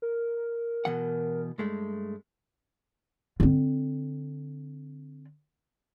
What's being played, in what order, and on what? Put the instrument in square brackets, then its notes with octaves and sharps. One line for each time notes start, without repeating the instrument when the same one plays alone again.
[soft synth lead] A#4
[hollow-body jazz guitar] B2 E3 F#5
G2 G#3 A3
[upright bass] D3 C4